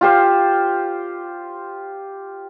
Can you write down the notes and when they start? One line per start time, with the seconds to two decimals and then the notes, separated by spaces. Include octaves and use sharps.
0.01 F4 G4 C5 F5